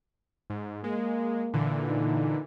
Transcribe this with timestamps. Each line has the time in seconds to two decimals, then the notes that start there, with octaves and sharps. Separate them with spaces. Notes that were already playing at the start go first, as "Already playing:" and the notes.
0.50 G#2
0.84 G#3 A#3
1.54 A#2 D3 E3
1.89 D#4